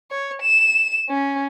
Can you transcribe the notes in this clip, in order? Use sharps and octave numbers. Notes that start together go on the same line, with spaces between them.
C#5
E7
C#4